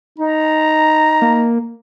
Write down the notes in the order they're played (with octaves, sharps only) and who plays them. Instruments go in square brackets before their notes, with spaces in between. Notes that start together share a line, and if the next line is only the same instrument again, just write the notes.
[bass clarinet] D#4 [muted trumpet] A#5
[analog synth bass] A#3